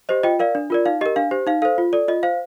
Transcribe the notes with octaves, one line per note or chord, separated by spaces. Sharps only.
G4 C5 D#5
F4 D#5 G5
A#4 D5 F5
D4
F4 A#4 D5
D#4 F5
G4 A#4 D#5
D4 F5
G4 C5
D#4 F5
A4 C5 F5
F4
A4 D5
F4 D#5
C5 F5